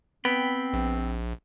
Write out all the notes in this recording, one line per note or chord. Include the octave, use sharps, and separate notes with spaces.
B3 C4 G5 B5
A#1